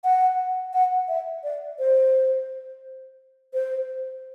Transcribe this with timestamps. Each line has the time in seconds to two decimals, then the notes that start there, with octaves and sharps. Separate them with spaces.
0.04 F#5
0.74 F#5
1.09 E5
1.44 D5
1.79 C5
3.54 C5